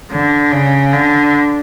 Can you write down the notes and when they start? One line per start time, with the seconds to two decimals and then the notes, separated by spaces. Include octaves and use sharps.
0.11 D3
0.52 C#3
0.93 D3